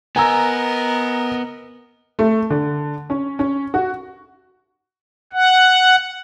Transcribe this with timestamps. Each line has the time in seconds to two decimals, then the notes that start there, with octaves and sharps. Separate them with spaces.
0.16 B3 A#4 D#5 G#5 A#5 E6
2.19 A3
2.50 D3
3.10 C#4
3.39 C#4
3.74 F#4
5.33 F#5